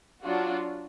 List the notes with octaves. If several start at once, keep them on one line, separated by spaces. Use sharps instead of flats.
F#3 D4 F4 F#4